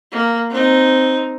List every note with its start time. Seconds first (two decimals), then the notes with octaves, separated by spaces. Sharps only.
0.12 A#3
0.50 C4 D#4